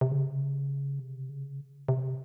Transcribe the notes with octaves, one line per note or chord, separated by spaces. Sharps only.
C3
C#3
C3
C#3
C3